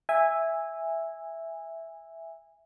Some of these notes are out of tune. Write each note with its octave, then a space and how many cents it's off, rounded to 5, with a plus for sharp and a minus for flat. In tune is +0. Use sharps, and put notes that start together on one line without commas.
E5 +0 G#5 -15